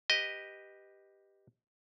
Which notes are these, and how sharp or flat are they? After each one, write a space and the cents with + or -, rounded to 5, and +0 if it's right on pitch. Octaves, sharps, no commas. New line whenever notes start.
G4 +0 B4 +0 D#5 +0